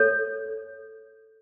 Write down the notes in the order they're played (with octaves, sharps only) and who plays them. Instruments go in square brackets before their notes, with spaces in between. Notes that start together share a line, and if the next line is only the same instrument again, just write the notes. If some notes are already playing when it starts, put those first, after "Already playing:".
Already playing: [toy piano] A4 C#5